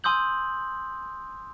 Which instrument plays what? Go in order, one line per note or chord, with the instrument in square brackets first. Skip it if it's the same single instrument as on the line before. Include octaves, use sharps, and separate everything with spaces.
[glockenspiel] G#5 C6 D#6 E6 G6 F#7